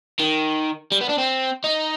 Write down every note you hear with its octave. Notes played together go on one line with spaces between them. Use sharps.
D#3
G3
B3
D4
C4
D#4